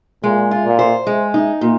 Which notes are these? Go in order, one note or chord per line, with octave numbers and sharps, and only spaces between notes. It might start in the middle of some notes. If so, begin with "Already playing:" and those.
A#2 G#3
F4
A#2
C5
G#3
D#4
A#2